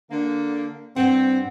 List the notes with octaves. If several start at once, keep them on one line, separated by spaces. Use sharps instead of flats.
D3 A#3
G2 E3 C4 F#5